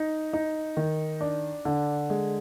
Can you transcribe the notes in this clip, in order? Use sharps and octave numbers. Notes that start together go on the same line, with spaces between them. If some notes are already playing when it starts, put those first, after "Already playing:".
Already playing: D#4
D#4
D#3
D4
D3
G#3